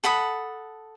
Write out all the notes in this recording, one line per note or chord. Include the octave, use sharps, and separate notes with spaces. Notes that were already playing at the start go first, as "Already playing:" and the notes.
A4 F#5 B5 D#6